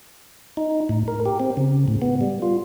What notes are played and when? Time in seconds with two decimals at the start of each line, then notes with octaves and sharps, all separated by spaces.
0.57 D#4
0.89 A2
1.08 A#4
1.26 G4
1.40 C4
1.57 C#3
1.88 A2
2.02 B3
2.21 G3
2.42 F4